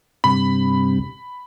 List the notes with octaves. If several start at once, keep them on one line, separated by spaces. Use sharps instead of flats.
G2 C3 B5